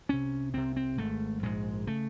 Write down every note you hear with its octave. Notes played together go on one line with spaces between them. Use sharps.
C2 C3 C#4
C2 C3 C4
C4
G#1 G#2 A3
A#1 G#2 G#3
C#3 A3